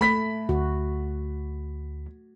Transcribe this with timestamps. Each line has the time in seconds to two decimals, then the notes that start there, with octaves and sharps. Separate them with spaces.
0.01 A3 B5 B6
0.49 D2 F#4